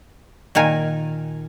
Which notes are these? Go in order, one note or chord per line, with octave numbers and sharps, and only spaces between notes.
A#2 D#3 A#4 G#5